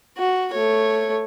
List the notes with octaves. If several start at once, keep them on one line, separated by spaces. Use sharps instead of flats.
F#4
A3 C#5